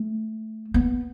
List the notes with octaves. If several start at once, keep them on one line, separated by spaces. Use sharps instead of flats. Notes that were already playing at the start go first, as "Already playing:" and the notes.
Already playing: A3
B3